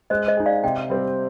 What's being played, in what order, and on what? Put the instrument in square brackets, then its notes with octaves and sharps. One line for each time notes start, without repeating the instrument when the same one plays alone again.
[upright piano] G#3 [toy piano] C5 D#5
[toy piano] C5 D#5
[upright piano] D#4 G#4
[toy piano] D5 F5
[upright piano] C3 [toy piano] D#5 G5
[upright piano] G3 C4 G4